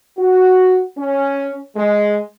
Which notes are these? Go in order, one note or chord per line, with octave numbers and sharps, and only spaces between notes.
F#4
C#4
G#3